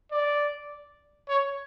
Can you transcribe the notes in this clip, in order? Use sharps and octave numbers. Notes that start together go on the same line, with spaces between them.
D5
C#5